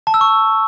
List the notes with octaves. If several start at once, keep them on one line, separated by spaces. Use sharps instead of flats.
A5
E6
C#6